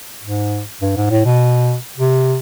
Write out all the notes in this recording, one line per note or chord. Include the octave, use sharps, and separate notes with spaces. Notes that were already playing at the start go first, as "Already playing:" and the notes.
G#2
G2
G#2
A2
B2
C3